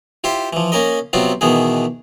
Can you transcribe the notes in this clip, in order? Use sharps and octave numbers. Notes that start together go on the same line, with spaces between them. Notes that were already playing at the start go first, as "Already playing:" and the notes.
E4 F4 G4 C5
E3 F3
A#3 C#4 A#4 D#5
C3 F#3 B3 C4 F4
B2 D#3 E3 B3 G#4